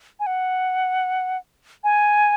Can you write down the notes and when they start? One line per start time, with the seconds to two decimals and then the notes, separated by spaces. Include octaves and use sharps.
0.20 G#5
0.27 F#5
1.84 G#5